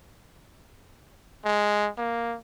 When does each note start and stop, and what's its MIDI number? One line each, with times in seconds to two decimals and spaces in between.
1.44 1.89 56
1.98 2.37 58